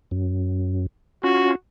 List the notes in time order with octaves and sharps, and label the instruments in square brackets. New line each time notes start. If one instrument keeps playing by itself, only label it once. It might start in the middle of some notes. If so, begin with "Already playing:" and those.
[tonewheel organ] F#2
[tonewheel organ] C#4 F4 [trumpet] F#4